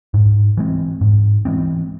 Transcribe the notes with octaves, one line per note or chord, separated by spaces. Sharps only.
G#2
E3 G#3 C4
G#2
E3 G#3 C4